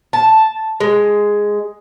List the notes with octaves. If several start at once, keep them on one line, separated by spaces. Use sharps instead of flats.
A5
G#3